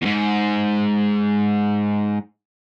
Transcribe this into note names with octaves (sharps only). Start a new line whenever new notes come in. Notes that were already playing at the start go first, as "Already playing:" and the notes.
E2 G#2